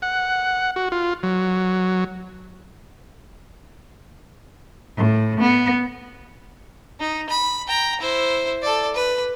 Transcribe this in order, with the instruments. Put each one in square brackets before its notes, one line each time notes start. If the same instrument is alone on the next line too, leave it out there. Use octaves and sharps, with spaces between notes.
[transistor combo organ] F#5
F#4
F4
F#3
[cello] A2
B3
[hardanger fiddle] D#4
B5
G5 A#5
E4 C5
A4 D5
B4